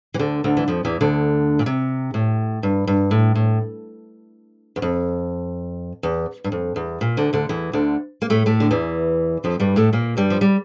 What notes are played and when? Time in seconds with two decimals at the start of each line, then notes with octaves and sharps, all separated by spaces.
0.14 E3
0.19 D2 D3
0.44 D2 D3
0.57 E3
0.68 F2 F3
0.85 E2 E3
1.01 D2 D3
1.59 A#2
1.66 C3
2.14 A2
2.63 G2
2.87 G2
3.11 A2
3.35 A2
4.76 E2
4.82 F2
6.03 E2
6.44 G2
6.52 F2
6.76 E2
7.01 A#2
7.17 D2 D3
7.33 D2 D3
7.49 E2 E3
7.73 D2 D3
8.22 A#3
8.30 A2 A3
8.46 A2 A3
8.60 D3
8.71 E2 E3
9.44 F2 F3
9.60 G2 G3
9.76 A2 A3
9.93 A#2 A#3
10.17 G2 G3
10.30 F3
10.41 G3